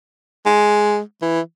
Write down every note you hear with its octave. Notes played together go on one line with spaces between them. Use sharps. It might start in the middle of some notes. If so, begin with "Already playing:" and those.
G#3
E3